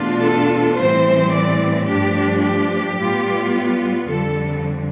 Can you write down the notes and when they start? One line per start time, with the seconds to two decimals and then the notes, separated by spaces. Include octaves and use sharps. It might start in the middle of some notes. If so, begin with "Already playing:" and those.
Already playing: E2 B2 A3 D4 F4
0.24 A4
0.80 A2 E3 G3 C4 C5
1.34 D5
1.88 G2 F3 A3 D4 G4
2.44 G4
2.98 A2 G3 B3 F4
4.07 F2 D3 G3 A4